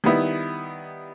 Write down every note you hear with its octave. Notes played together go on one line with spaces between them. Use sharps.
D#3 G3 B3 E4